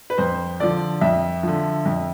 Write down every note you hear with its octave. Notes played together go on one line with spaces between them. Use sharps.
B4
F2 C5
D3 F3 D5
F2 E5
D3 F3
F2